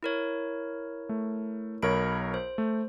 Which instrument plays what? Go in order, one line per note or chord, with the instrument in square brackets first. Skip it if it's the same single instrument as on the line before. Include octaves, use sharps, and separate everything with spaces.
[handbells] E4 A#4 C#5
[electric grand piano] A3
[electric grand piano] B1 A#4 C#5 [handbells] B5 D7
[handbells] C5
[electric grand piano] A3